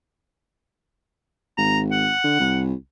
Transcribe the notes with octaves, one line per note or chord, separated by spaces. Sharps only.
G#1 A#5
F#5
D3
C2